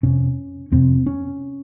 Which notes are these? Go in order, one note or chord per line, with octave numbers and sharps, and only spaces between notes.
F2 C3 C#4
F2 C3 C4
C#4